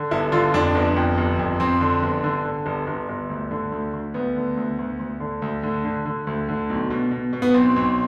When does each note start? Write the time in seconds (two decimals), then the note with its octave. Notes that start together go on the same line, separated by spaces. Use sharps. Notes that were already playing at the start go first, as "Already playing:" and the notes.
Already playing: D3
0.11 G1 E4
0.32 D3 F4
0.54 F2 D4
0.75 G1
0.96 F2
1.18 G1
1.39 F2
1.60 F2 C4
1.81 D3
2.03 G1
2.24 D3
2.45 D3
2.66 G1
2.87 G1
3.09 G1
3.30 D2
3.51 D3
3.72 D2
3.93 D2
4.14 D2 B3
4.36 D3
4.57 D2
4.79 D2
4.99 D2
5.20 D3
5.42 D2
5.63 D3
5.85 D3
6.05 D3
6.27 D2
6.49 D3
6.69 B1
6.90 B2
7.11 B2
7.33 B2
7.42 B3
7.54 B1 C4
7.76 B1